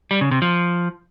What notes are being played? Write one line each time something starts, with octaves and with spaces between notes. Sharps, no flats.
G3
C#3
C3
F3